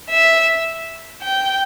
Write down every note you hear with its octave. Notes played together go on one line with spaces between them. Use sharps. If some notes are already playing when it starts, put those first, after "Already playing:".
E5
G5